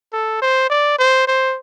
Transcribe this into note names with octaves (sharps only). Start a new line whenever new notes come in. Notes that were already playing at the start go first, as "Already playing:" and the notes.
A4
C5
D5
C5
C5